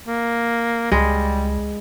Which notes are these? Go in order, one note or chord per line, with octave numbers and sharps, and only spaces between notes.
A#3
C#2 G3 G#3